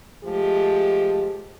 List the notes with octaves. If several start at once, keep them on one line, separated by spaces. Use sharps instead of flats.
F3 G#3 A3 G4